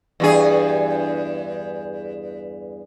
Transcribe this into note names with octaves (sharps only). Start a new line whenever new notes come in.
E2 G2 G#4